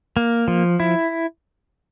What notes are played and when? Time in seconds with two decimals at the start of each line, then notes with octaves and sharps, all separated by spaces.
0.17 A#3
0.48 F3
0.80 E4